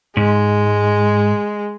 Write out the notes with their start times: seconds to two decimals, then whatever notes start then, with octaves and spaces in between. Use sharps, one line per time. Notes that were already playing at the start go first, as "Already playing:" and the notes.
0.17 G#2 G#3